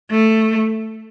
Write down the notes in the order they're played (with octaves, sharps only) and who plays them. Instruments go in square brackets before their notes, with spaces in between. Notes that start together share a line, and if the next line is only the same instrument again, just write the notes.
[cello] A3